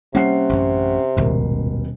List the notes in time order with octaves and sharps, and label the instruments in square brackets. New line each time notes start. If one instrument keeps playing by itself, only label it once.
[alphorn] C3 [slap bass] G3 A#3 [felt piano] C#4 F#5 C7
[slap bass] A1 F#2
[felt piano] D#1 B2 A#4 [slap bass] G#1 C#2 G#2